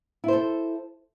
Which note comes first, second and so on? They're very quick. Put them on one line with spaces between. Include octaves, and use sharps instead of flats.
E4 C5 A4